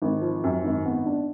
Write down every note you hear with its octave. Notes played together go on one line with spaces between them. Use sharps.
G#1
F3
F#2
G#1
B3
D4